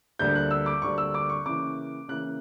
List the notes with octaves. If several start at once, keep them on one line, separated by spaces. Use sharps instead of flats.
D2 D3 G3 A#3 G6
F#6
E6
D6
D2 D3 G3 A#3 C#6
E6
D6
C#6
C#3 E3 A#3 D6
C#3 E3 A#3 F#6